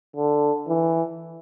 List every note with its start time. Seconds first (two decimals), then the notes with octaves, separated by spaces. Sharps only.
0.17 D3
0.68 E3